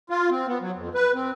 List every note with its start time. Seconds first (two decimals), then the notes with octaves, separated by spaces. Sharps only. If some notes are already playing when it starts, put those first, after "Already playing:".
0.10 F4
0.30 C4
0.47 B3
0.61 F#3
0.76 F2
0.95 B4
1.14 C4